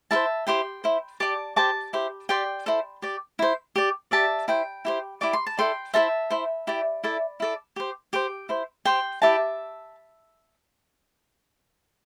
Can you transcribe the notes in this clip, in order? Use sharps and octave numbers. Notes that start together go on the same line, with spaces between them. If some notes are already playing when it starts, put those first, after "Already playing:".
E4 A4 C5 E5 A5
E4 G4 C5 G5 C6
E4 C5
G4 D5 A5 D6
G4 C5 A5 D6
E4 G4 C5
G4 D5 G5 C6
E4 A4 C5
G4 D5
E4 C5
G4 D5
G4 D5 E5 A5
E4 C5 G5
E4 G4 C5
E4 G4 D5 D6
C6
A5
E4 A4 D5 G5 C6
E4 A4 C5 E5 A5
E4 C5
E4 G4 D5
E4 A4 D5
E4 A4 D5
G4 C5
G4 C5 G5
E4 C5
G4 C5 G5 C6
E4 G4 D5 E5 A5